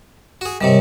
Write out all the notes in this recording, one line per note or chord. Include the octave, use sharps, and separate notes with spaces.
F#4 G#4
G#2 C3 D#3 G3 A#4 C#5